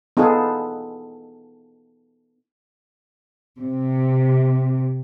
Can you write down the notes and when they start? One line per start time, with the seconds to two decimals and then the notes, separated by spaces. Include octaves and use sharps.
0.17 B3 D#4 F4 G#4 A4
3.58 C3